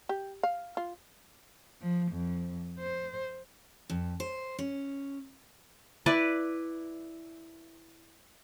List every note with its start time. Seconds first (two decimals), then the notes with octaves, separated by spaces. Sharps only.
0.09 G4
0.43 F5
0.77 F4
1.81 F3
2.12 F2
2.80 C5
3.90 F2
4.20 C5
4.59 C#4
6.06 E4 B4 D5